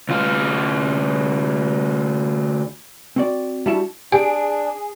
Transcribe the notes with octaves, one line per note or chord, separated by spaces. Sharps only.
D2 F4
C4 F#4 D5
G3 D4 E4 F#4 A5
D4 G4 G#4 D7